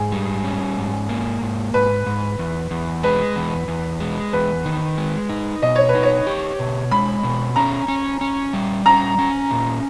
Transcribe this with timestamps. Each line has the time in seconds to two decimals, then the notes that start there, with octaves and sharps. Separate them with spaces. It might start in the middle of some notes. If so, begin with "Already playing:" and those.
Already playing: G#2 G#4
0.12 G3
0.44 C#4
0.77 G#2
1.09 A#3
1.42 G#2
1.74 G#2 B4
2.06 G#2
2.39 E2
2.71 E2
3.03 G#3 B4
3.36 E2
3.68 E2
4.00 G#3
4.33 E2 B4
4.65 D#3
4.97 G#3
5.29 D#4
5.62 B2 D#5
5.76 C#5
5.89 B4
5.95 D#4
6.03 C#5
6.27 G4
6.59 B2
6.91 G#3 B5
7.23 B2
7.56 C#4 A#5
7.88 C#4
8.21 C#4
8.53 G3
8.86 C#4 A#5
9.18 C#4
9.51 A#2